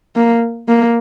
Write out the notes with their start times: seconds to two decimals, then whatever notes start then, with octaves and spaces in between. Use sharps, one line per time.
0.16 A#3
0.68 A#3